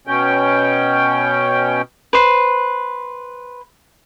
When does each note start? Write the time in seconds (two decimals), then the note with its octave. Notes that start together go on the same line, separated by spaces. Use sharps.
0.07 B2 C#4 G5
2.13 B4 C5